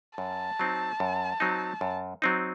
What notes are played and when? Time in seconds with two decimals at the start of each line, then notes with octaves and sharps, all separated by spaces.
0.18 F#2 A5
0.59 F#3 C4 D#4
1.00 F#2
1.40 F#3 C4 D#4
1.81 F#2
2.22 F#3 C4 D#4